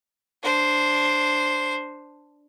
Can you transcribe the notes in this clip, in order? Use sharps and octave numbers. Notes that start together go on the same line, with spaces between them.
D4 C5